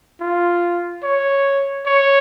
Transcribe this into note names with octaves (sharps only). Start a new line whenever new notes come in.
F4
C#5
C#5